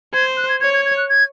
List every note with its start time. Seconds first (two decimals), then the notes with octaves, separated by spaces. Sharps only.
0.14 C5 G#6
0.37 F#6
0.49 G#6
0.61 C#5 G#6
0.73 G#6
0.85 G#6
0.97 F#6
1.09 G#6